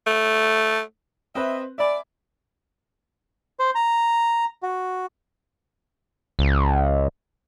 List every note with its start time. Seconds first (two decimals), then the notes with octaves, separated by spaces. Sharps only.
0.07 A3
1.35 C4 B4 D#5 E5
1.78 D5 E5 G#5 B5
3.60 C5
3.75 A#5
4.63 F#4
6.39 C#2